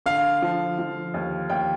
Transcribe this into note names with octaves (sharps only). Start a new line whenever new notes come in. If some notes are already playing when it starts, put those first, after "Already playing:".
D3 F5
F3
F3
D#2
D#2 G5